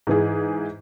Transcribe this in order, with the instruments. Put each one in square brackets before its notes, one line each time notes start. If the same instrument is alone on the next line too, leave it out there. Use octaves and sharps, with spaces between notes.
[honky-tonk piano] G#2 E3 G#4